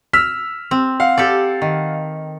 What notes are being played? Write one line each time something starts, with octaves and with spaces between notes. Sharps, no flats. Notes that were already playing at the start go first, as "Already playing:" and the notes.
E6 F6 B6
C4
F5 F#5
G4 A4 D5
D#3